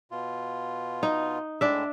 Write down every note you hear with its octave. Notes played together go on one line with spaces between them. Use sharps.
B2 F4
D#4
A2 G#3 D4 E5